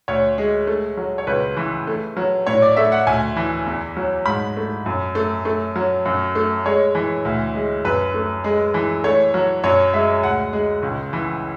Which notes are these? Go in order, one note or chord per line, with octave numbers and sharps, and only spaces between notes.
D2 C#5
G#3
A3
F#3
C#5
C#2 B4
E3
A3
F#3
A2 C#5
D5
A3 E5
F#5
D2 G#5
E3
E2
F#3
G#2 B5
A3
F#2
A3
A3
F#3
F#2
A3
G#3 C#5
E3
D2
G#3
F#2 B4
A3
G#3
E3
A3 C#5
F#3
F#2 C#5
G#3 E5
D2 F#5
G#3
C#2
E3